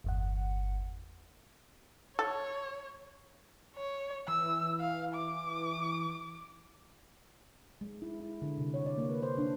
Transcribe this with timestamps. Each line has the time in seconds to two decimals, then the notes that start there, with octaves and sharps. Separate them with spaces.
0.04 G1 E2 F#5
2.19 A4 C#5
3.76 C#5
4.28 E3 E6
4.80 F5
5.14 D6
7.81 G#3
8.02 E4
8.20 E4
8.42 D3
8.58 C3
8.74 C#5
8.86 D5
8.98 A#3
9.09 B4
9.23 C5
9.38 D4